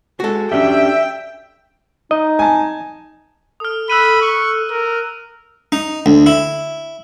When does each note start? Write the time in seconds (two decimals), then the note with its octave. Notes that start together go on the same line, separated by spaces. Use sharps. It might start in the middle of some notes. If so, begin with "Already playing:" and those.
0.20 G#3 F#4 A4
0.52 C#4 D4 G4 E5 G5
2.11 D#4 D#5
2.39 G#5 A5
3.60 A4 D#6 F6
3.90 B5 E6 F#6 D#7
4.22 C#6
4.71 A#4
5.72 D#4
6.06 D2
6.26 E4